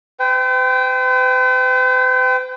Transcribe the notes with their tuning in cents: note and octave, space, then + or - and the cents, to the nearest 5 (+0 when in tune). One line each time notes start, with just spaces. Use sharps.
C5 -45 G5 +0